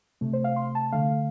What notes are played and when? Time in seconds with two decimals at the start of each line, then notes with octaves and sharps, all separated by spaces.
0.21 C3 A3
0.33 C5
0.44 F5
0.56 C6
0.75 A5
0.92 D3 A3 F5